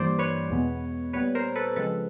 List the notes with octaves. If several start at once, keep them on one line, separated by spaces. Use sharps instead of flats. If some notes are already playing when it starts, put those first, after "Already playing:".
Already playing: G2 E3 G3 A#3 C5 D5
B4 C#5
E2 B2 G#3 B3
A#2 G3 B3 B4 C#5
A#4 C5
A4 B4
C#3 F3 G#3 C4 A4 B4